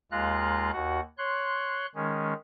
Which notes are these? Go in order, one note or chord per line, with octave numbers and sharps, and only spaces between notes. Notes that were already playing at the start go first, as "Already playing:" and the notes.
D#2 G#3 F4 F5 A#5 F#6
D#2 F#4 F#5
C#5 C6 F#6
D#3 G#3 C#4